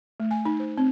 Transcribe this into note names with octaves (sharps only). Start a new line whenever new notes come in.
A3
G#5
D#4
C5
C4